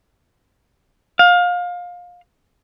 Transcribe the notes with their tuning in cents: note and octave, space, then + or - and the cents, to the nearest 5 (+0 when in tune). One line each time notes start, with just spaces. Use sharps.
F5 +25